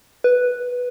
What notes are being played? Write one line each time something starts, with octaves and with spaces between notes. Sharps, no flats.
B4